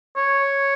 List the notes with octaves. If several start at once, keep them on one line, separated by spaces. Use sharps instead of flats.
C#5